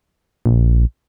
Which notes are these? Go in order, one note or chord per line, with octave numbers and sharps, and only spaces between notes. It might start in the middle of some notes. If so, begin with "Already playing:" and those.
A#1